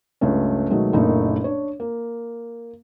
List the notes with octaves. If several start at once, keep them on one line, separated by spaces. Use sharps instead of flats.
C#2 G2 A3 C#4
B2 D#3 F#3 G#3 A3
F#1 A#2 A3 D4 D#4
D4 C#5
A#3